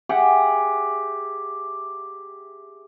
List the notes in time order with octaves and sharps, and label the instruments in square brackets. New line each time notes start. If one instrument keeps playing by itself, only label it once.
[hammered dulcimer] G4 G#4 E5 F#5